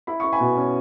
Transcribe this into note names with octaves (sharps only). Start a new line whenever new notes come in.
E4 B5
E4 C#6
G#5 B5
B2
C#4